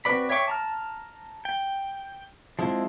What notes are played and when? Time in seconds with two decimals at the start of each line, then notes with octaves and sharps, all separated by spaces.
0.05 C4 F#4 B4 D5 B5
0.30 C#5 E5 G5 C#6 D6
0.48 A5 A#5 F6
1.45 G5
2.59 F3 G#3 C4 E4